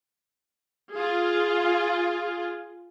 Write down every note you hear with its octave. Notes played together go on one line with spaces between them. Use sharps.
F4 G#4